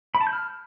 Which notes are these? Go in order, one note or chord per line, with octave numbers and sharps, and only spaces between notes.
B5
A5
G6
F6